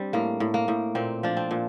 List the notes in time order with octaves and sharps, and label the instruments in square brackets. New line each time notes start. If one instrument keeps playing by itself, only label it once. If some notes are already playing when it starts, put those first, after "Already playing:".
Already playing: [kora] G3 C4 D4
A2 A#3
A2
A#3
A2
A#2 C4
F3 D4
C4
A#2